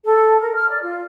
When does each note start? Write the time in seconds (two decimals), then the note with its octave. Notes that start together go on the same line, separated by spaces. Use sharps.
0.04 A4
0.40 A#4
0.54 F6
0.68 D5
0.81 F4